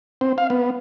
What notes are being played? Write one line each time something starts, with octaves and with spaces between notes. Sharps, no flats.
C4
F5
B3